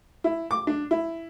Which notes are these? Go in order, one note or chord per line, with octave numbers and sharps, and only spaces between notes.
E4
D6
D4
E4